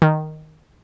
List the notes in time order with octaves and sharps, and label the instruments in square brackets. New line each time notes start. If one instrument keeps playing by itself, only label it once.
[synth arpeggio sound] D#3